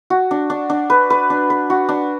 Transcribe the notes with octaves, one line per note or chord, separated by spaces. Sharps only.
F#4
D4
D4
D4
B4
B4
D4
B4
F#4
D4